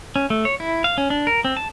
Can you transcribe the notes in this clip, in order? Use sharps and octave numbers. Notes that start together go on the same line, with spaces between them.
C#4
A3
C#5
E4
F5
C#4
D4
A#4
C4
A5